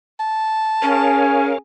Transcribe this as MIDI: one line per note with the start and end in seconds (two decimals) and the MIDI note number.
0.20 1.32 81
0.82 1.52 61
0.82 1.53 68
0.82 1.58 70
0.82 1.58 73
0.82 1.58 77
0.82 1.53 80